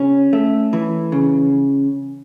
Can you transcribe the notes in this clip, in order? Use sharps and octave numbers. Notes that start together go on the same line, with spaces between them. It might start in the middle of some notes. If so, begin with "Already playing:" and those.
Already playing: C#3 C#4
A3
E3
C#3